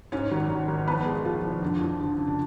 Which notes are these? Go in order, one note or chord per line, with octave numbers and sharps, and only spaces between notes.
G#2 C#4 C#5
G#1
G#1
G#1
F3 B3 B4
F3 G#3 G#4
F3 F4
F3
F2 D3 D4
F2
D3 F3 D4
C#3
D4